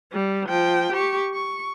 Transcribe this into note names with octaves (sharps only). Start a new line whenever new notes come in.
G3
F3 G5
G4 C#6
C#6